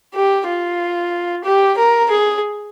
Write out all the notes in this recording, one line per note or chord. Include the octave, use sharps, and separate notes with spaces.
G4
F4
G4
A#4
G#4